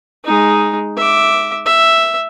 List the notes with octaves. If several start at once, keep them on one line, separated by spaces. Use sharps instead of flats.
G#3 D#4
E5 D6
E5